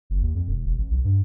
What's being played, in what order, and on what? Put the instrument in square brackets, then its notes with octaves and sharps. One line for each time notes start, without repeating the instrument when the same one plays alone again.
[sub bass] F#1
D#2
F2
E1
E1
A1
B1
G2